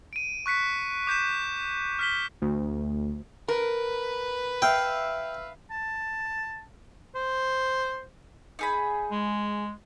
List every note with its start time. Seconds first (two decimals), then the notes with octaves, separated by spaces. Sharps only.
0.13 D7 D#7
0.46 C#6 F#6 B6 C#7
1.07 D6 G6 B6 E7
1.99 F6 B6 G7
2.42 D2
3.48 A#4 B4
4.62 E5 F5 G5
5.71 A5
7.15 C5
8.59 D#4 G#4 B5
9.11 G#3